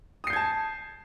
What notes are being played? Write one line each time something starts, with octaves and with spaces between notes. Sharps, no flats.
A5 D#6 G6 G#6 C7